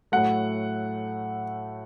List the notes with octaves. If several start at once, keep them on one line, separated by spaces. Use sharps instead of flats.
A2 F#3 A3 F#5